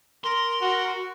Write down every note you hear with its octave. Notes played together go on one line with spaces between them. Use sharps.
A#4 C6
F#4